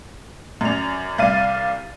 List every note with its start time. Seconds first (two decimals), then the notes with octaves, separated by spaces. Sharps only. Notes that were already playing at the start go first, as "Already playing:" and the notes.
0.61 F#2 D5 F7
1.18 C2 D5 F5 A6 D#7